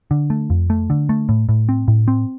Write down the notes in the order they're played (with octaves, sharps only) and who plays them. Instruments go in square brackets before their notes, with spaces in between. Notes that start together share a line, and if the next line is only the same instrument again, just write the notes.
[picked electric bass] D3
A3
F2
A3
D3
A3
A2
A2
C4
A2
C4